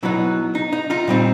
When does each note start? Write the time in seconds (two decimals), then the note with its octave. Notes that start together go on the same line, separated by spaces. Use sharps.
0.03 B2 F#3 B3 D#4 E4
0.55 D#4
0.73 D#4
0.90 D#4 F4
1.07 A#2 G3 C4 D#4